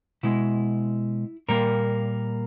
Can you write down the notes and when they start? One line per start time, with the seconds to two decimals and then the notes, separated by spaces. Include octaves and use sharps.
0.23 B2 G#3 E4
1.48 A#2 G3 A#3 A#4